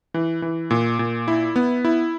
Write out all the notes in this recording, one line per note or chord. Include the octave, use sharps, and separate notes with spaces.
E3
E3
A#2
A#2
E4
B3
E4